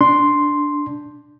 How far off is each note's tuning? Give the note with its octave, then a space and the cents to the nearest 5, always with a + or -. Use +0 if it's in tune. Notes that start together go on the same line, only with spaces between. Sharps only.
D4 +0 C6 +0